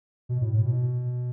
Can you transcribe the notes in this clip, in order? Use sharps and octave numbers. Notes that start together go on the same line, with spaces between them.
B2
A2
A2
B2